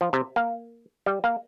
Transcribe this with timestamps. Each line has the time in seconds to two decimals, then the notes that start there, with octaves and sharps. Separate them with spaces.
0.01 F3
0.13 C3
0.36 A#3
1.06 G3
1.24 A#3